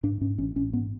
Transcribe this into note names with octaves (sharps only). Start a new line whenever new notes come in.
G#2 D4
G#2 C#4
A1 C#4
A1 C#4
G#2 B3